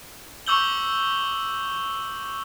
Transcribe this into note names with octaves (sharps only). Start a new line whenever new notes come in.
C#6 D6 E6 G6 F#7 G7